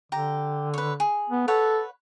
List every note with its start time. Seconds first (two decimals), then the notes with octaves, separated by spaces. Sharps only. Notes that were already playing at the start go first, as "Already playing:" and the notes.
0.12 D3 G4 A#5
0.74 B4 C#5
1.00 G#4
1.30 B3
1.48 A4 B4 C#5 F#5